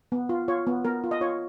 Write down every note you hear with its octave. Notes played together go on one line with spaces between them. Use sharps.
B3
F4
F4 C#5
B3
B3 A#4
F4
D#5
F4 C#5